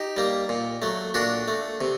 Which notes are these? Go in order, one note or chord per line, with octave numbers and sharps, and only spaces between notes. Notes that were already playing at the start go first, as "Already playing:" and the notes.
Already playing: D#4 G4
G3 A#3
A#2
F#3 A3
A#2 D4 F#4
A3
C3